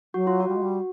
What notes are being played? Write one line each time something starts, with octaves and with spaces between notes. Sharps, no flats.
F#3 F#4
F4
F#4
G3
G#3
G3